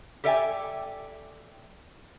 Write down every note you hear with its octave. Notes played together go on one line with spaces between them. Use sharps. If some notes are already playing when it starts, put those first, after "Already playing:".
G4 A4 D5 E5 G5 G#5